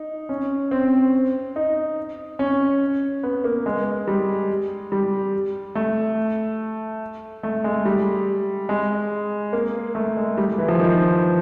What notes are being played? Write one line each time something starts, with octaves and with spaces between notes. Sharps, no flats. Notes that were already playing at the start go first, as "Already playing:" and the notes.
Already playing: D#4
C#4
C4
D#4
C#4
B3
A#3
G#3
G3
G3
A3
A3
G#3
G3
G#3
A#3
A3
G#3
G3
E3
F3
D#3